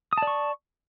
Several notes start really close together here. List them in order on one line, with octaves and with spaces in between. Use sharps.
D#6 A5 D5 C#6